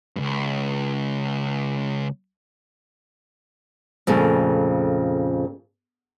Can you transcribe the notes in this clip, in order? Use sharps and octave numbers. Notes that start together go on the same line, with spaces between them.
C#2 G2
F2 A#2 C#3 A3